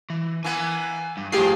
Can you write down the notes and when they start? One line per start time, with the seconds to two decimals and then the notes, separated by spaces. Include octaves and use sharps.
0.10 E3
0.44 E3 A#3 B3 G#5
1.17 G2
1.32 A2 F3 A#3 F4 G4 G#4 C7